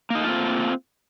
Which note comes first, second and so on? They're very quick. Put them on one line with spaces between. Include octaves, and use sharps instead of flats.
A#3 D#4 A3 F4 C4